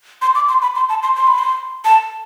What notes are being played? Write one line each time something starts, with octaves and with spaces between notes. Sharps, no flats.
C6
D6
C6
B5
C6
A5
C6
C6
B5
C6
A5